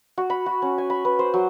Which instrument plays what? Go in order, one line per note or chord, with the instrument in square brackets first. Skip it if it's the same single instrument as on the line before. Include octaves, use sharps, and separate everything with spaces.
[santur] F#4
B5
F#4
C#4
G#5
B5
B4
C5
F#3